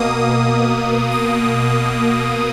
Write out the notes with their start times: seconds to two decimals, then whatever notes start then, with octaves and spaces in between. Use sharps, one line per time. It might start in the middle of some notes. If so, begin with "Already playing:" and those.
Already playing: B2 A#3 D#6
1.11 D#6